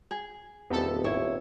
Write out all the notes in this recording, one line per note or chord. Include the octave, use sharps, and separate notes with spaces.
G#4
D#1 E2 B3 C4 G4 A4
G#1 E4 C#5